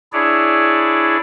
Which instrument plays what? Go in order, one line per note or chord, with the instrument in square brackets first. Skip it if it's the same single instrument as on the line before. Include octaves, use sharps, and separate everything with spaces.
[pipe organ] D4 E4 G#4 C#5 D5